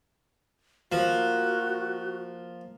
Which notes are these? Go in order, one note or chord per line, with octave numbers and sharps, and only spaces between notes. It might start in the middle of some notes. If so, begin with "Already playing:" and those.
F3 A#3 F#4